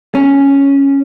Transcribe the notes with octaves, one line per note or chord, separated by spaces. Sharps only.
C#4